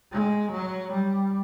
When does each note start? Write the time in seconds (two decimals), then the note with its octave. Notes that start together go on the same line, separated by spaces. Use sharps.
0.12 G#3
0.52 F#3
0.92 G3